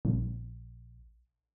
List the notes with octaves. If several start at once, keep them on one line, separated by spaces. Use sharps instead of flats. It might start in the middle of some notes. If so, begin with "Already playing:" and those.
A#1